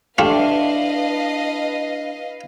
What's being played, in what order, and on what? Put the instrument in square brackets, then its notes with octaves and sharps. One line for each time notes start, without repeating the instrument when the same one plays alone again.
[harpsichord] A3 F4 G4 [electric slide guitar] D4 [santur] E4 [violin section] B4 D#5 F5